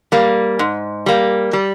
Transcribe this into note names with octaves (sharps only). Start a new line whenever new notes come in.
G3 A#3
G#2
G3 A#3
G3